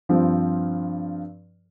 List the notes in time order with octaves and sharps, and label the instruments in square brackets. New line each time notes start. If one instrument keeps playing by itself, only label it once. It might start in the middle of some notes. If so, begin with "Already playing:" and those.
[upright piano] G2 F3 C4